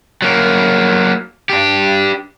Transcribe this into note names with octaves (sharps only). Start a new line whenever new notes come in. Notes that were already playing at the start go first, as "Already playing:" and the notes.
F#3 A#3
D4 G4